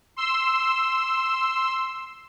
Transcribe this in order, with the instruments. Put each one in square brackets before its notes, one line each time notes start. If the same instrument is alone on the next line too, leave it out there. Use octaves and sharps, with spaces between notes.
[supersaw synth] C6 E6